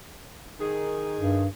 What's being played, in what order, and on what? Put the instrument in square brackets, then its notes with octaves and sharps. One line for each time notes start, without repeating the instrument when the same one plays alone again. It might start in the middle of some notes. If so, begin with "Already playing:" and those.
[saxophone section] D#3 G#4
[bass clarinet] G2